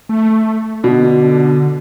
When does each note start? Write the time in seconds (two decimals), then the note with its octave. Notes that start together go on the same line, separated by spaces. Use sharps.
0.09 A3
0.84 B2 D3